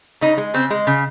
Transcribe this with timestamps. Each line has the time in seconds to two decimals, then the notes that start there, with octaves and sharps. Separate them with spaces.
0.21 C#3 D#4
0.38 G#3
0.54 C#3 C4
0.70 G#3
0.87 C#3